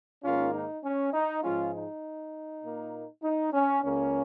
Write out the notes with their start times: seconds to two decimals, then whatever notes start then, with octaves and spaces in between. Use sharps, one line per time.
0.23 G#2 D#3 A#3 C#4 F4
0.53 D#4
0.84 C#4
1.13 D#4
1.43 G#2 F3 G#3 C#4 F4
1.73 D#4
2.62 A#2 A#3
3.23 D#4
3.53 C#4
3.82 C#2 C#3 A#3 C#4